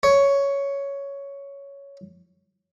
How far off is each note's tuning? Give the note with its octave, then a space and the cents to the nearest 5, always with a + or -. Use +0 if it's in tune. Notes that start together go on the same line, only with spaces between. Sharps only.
C#5 +10